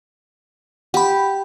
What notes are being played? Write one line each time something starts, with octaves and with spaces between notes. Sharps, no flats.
G4 F#5 B5